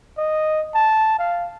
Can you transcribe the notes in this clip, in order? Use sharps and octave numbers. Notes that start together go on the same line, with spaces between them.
D#5
A5
F5